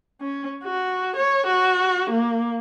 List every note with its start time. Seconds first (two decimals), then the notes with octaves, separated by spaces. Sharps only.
0.21 C#4
0.64 F#4
1.17 C#5
1.47 F#4
2.10 A#3